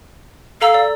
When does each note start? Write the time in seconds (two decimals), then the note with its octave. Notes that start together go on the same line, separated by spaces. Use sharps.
0.61 A4 F5 A#5 E6
0.74 D5